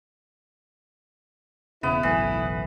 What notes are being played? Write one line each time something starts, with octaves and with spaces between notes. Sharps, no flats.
E1 C#3 B3 E4
F#1 B1 A2 E3